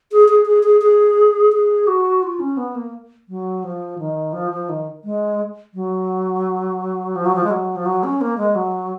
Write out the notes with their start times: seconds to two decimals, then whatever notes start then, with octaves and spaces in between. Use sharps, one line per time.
0.12 G#4
0.29 G#4
0.46 G#4
0.64 G#4
0.82 G#4
1.53 G#4
1.87 F#4
2.23 F4
2.40 C#4
2.57 B3
2.75 A#3
3.29 F#3
3.64 F3
3.99 D#3
4.33 F3
4.51 F3
4.69 D#3
5.04 G#3
5.74 F#3
7.16 F3
7.26 F#3
7.35 F3
7.44 G#3
7.51 F#3
7.76 F3
7.85 F#3
8.04 C#4
8.21 A#3
8.38 G#3
8.55 F#3